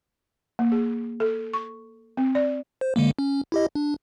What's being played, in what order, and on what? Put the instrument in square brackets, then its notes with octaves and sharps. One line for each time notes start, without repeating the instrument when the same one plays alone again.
[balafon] A#3
G#4
A4
C#6
C4
D5
[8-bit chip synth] C5
D3 G#3 A#3
C#4
E4 G4 D#5
D4